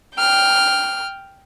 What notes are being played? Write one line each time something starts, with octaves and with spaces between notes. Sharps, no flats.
G5 F6